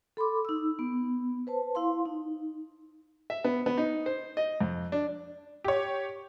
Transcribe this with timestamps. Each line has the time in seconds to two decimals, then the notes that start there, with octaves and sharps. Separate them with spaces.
0.17 A4 B5 C6 D6
0.45 D#4 E6
0.79 B3
1.47 B4 C5 A5
1.75 E4 F5 C6
2.06 D#4
3.30 E5
3.44 B3
3.66 B3
3.77 D#4
4.06 C5
4.37 D#5
4.61 F2
4.92 D4
5.64 G4 C#5